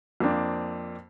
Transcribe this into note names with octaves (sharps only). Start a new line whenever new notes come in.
F2 A#3 C4 D4